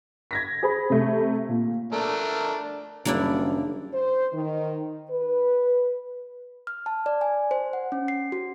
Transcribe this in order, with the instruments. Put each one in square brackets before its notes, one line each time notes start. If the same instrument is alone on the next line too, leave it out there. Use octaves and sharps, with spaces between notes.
[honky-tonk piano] G#6 A#6 B6
G#4 C5 B5
C3 A3
A#2
[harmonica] A3 D4 A#4
[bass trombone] F#1 [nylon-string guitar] D#3 G3 C#4 [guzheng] A#3 D4 E4
[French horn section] C5
D#3
B4
[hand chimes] F6
A5
D5
G#5
C5
F#5
C#4
C7
F#4